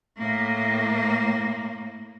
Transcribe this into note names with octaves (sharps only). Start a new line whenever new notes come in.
A2 A#3